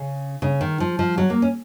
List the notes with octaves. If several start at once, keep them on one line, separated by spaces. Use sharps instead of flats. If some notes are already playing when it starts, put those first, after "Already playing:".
Already playing: C#3
C#3
D#3
F3
F3
F#3
A#3
C#4